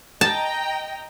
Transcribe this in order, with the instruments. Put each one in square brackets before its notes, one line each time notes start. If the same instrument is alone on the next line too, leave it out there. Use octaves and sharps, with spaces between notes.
[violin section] D#5 G5 A#5 [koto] A5